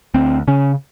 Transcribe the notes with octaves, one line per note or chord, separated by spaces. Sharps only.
D2 C4
C#3 C#4